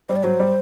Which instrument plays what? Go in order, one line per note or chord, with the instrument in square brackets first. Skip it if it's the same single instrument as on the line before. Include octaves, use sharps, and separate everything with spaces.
[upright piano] G3 [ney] C5
[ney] D5
[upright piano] F#3 [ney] C5
[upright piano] G3